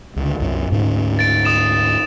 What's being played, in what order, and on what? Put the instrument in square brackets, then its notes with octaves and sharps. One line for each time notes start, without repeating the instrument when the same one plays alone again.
[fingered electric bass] C#2 D3
C2 F#2
D2 G#2 C#4
[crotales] A6 D7
D#6 E7